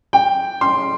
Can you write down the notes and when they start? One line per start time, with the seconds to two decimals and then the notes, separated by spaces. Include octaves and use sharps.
0.13 G5
0.61 C6